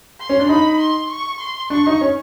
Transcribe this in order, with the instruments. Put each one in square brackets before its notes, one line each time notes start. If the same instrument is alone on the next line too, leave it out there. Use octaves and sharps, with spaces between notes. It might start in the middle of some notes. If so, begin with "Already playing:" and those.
[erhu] C6
[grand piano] C#4
D4
[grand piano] D#4 [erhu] B5
[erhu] C6
C#6
C6
[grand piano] D4 [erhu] C#6
[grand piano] D#4
C#4